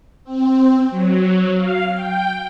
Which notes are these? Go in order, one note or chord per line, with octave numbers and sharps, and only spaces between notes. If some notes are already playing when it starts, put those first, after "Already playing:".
C4
F#3
F5
G5